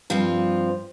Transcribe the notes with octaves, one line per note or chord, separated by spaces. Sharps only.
G2 F3 C4 F4